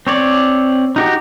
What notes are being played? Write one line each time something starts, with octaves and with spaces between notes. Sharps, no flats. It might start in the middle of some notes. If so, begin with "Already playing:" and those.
C4 C#5 D5
D#4 F#4 G4